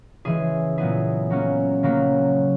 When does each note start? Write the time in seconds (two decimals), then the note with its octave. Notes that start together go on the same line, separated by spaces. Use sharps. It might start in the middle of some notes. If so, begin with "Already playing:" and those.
0.25 C#3 E3 G#3 G#4
0.77 A#2 F#3 B3 E4 G#4
1.30 F#3 A#3 C#4
1.83 C#3 F#3 A#3